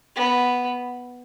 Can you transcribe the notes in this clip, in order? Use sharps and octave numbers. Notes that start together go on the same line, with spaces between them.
B3